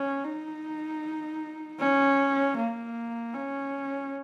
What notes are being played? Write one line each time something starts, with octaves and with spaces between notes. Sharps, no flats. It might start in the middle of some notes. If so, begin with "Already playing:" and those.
Already playing: C#4
D#4
C#4
A#3
C#4